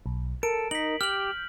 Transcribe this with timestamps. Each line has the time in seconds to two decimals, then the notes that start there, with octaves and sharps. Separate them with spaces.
0.06 B1
0.43 A4 A#4 D7
0.71 D#4 B6 F#7
1.01 G4 F6 G6 F#7